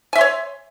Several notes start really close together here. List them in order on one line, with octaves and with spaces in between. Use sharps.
G#5 E5 C6 C#5